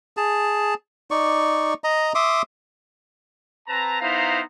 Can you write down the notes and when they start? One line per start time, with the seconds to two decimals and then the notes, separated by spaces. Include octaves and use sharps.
0.17 G#4 A5
1.11 D#4 D5 C#6
1.84 D#5 A#5
2.15 E5 C6 D6 D#6
3.68 C4 B4 A5 A#5
4.01 B3 D#4 E4 C5 F5 A#5